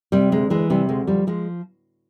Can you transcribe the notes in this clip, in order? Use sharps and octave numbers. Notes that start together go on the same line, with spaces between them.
C3 G3
D2 G#3
E3 G#3
C3 G3
D2 G#3
F3 G3
F3 G#3